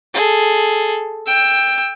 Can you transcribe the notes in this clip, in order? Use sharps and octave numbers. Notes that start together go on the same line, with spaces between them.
G#4 A4
G5 E6